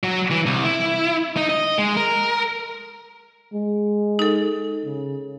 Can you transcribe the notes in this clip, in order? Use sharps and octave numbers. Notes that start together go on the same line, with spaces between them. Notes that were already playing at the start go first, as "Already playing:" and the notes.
F#3
E3
C2
E4
D#4
D#5
G#3
A#4
G#3
D#4 A4
C#3